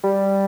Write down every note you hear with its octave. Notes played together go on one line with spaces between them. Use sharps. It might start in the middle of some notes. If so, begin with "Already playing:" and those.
G3